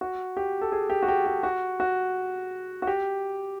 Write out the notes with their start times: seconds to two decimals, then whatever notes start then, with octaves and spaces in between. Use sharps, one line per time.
0.01 F#4
0.37 G4
0.61 A4
0.72 G#4
0.90 G4
1.03 F#4
1.08 G4
1.26 G4
1.43 F#4
1.80 F#4
2.82 F#4
2.87 G4